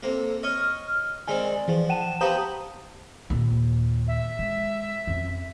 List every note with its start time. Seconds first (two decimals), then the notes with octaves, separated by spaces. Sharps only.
0.03 C3 A#3 A4
0.43 C#5 D#5 F6
1.28 D#3 G#3 C4 D5 G#5
1.68 E3 F3 G#4
1.89 F#5 G5 A5 D#7 E7
2.21 B3 G4 B4 C5 F5 A#5 D#6 G6
3.30 D#2 A#2
4.08 E5
4.39 G#3
5.07 F2 C#4